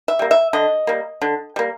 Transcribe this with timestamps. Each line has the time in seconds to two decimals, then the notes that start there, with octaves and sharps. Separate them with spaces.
0.08 E5
0.19 G3 A#3
0.31 E5
0.53 D3 D#5
0.87 G3 A#3
1.22 D3
1.56 G3 A#3